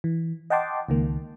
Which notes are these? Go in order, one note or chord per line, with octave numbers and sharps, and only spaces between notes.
E3
D#5 F#5 G5 A5 C6 D6
C#2 D#3 A#3